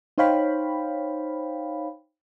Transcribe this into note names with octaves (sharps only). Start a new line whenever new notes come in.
D#4 C5 C#5 F5 G5 B5